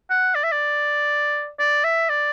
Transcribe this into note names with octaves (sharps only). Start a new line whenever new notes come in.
F#5
D5
E5
D5
D5
E5
D5